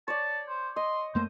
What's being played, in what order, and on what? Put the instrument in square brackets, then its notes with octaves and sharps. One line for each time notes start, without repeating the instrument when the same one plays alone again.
[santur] C#5 D5 [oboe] A5
[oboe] C5
[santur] D#5 [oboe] C6
[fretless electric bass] F#2 A3 A#3 [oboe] C5